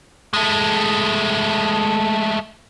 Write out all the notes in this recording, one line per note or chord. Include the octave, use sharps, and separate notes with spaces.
G#3 A3